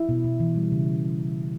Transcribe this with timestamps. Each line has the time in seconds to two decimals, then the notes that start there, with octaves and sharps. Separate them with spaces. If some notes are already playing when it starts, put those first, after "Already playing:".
Already playing: E4
0.09 B2
0.24 B2
0.40 E3
0.56 G3
0.72 C#3